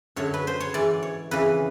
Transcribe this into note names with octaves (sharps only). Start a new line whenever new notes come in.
F#2 D3 F#3 C#5
B4
C5
C#5
G#2 E3 D5
C#5
F2 C#3 E3 B4